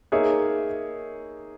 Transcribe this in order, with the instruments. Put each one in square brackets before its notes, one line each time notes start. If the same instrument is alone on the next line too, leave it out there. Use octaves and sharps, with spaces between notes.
[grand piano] A#3 D#4 G#4 C#5 E5